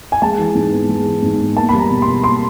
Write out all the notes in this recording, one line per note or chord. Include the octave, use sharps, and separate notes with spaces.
G#5
G#3 A5
E3
G#2
B3
G#3
E3
G#2
B3
A#3 A5
G3 B5
A#5
B2
C6
B2
A#3 C6